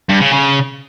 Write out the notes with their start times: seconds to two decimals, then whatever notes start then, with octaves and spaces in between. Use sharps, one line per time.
0.09 G2
0.21 C#3
0.33 C#3